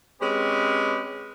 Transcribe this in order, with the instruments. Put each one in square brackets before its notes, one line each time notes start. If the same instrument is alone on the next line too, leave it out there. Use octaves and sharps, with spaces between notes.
[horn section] G#3 C4 C#4 G4 B4